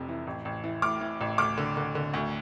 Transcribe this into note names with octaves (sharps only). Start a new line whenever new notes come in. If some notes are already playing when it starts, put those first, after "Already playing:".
Already playing: F1 F2 C3
E3
A1
A1
E3
A2 D6 F6
E3
A1
D2 D6 F6
D3
D3
D3
D2